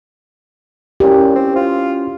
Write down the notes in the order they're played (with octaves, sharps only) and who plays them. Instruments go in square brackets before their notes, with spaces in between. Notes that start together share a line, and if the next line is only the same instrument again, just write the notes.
[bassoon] A#2 [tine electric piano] C#4 E4 [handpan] G4
[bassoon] C4
F4